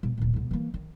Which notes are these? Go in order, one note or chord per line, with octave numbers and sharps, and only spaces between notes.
B2
D1 A#2
D2 B2
E3 A#3
D#3